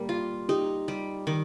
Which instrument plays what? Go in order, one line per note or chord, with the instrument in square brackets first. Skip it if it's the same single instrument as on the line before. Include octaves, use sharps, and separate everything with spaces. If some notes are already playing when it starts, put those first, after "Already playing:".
Already playing: [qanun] G3 A#3 [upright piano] G4 A#4
[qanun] F4
[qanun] D#4 [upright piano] G4
[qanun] G3
D#3